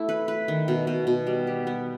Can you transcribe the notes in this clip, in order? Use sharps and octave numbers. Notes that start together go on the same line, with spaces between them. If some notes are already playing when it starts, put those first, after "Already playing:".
Already playing: A3 E4
B4
B4
D#3
B2
B2
B2
G3
G4
B3